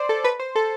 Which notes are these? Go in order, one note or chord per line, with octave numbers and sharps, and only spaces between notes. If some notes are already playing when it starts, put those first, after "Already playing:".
Already playing: C5 D5
A4
B4
C5
A4